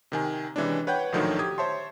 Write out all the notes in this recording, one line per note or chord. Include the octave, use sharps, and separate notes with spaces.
C3 D#3 G#5
C3 E3 G#3 C#4 D4
B4 C#5 F#5 G5 G6
A#1 A2 D3 D#3 F3 F#3
G4 D#6 G#6
C5 C#5 E5 A5 C6